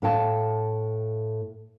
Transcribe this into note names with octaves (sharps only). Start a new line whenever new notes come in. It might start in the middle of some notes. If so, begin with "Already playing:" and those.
A2 A4 F5 G5 A5